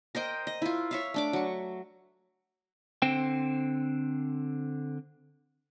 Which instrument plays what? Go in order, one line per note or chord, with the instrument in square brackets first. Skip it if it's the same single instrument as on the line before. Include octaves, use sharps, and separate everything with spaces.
[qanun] A#4 C5 D#5 G5
D#5
E4 F4
C#5 E5 F5
A3 D4 D6
F#3 C#6
[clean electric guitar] D3 C4 C5 G5